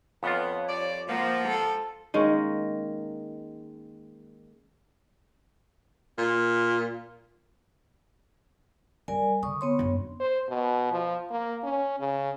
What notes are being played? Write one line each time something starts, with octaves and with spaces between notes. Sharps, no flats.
F2 B3 F4 C#5
F3 G3 D5
F3 A#3 F#5
A4
D#3 G#3 A#3 C#4
A#2
G3 A#4 D5 G#5
D3 C#6 D#6
B3 C#5 C6
F#2 D4
C5
B2
F3
A#3
C#4
C#3